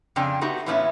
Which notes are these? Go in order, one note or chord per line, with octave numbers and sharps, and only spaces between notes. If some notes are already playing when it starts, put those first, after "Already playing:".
F2 C#3 C4 D4 G5 G#5
A3 B3 D#4 F#4 G4
A2 E3 A#3 B3 C#4 E4